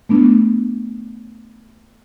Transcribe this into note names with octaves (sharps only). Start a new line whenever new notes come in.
A3 B3 D4